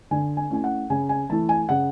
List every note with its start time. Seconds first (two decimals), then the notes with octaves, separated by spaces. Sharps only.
0.11 D3 G#5
0.37 G#5
0.50 A3 C#4 E4 G#5
0.64 F#5
0.90 C#3 G#5
1.09 G#5
1.29 E3 A3 E4 A5
1.49 G#5
1.69 C#3 F#5